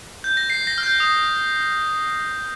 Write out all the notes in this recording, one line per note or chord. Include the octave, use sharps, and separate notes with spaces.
G6
A#6
C7
A#6
F6
G6
D#6